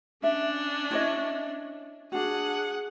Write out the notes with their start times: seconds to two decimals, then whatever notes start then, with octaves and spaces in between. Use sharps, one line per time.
0.23 C#4 D4 E5
0.91 E4 C#5 D#5
2.12 D4 F#4 G#4 F#5